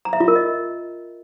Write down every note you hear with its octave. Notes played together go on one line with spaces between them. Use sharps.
A#5
E5
F4
A#4
D#5